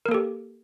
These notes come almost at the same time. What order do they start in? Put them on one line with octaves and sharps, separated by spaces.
A#4 A#3 A4 G4